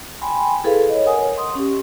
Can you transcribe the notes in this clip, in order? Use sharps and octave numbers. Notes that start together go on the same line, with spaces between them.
G5 G#5 B5 C6
E4 G#4 A4 B4 F5
C#5 D#5
A#4 F#5 G#5 D#6
C6 D#6
C#4 G4